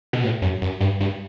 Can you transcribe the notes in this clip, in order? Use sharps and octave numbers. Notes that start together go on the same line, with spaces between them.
B2
A2
F#2
F#2
G2
G2